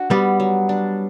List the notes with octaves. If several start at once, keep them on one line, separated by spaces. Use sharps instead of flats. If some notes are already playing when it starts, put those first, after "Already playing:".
Already playing: D4 F#4
G3 B3
F#3
D4